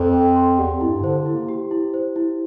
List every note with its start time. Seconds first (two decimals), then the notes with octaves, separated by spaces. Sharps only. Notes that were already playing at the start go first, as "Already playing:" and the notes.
Already playing: F2 A4 C5 C6
0.13 G5
0.36 C6
0.58 E2 G4
0.73 F2
0.81 E4
0.88 G2
1.03 D3 C5
1.18 D3
1.26 E4
1.33 A#3
1.48 G4
1.71 E4
1.94 C5
2.16 E4